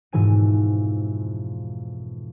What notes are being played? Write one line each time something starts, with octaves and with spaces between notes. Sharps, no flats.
F2 G#2 B2 E3 G#5 D#7